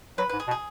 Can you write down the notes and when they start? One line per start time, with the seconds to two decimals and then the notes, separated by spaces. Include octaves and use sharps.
0.18 F#3 B4
0.29 G#2 B4
0.40 G#4
0.48 B2
0.51 G#4